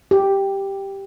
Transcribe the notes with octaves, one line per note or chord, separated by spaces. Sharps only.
G4